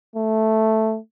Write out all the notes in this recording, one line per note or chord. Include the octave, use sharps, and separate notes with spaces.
A3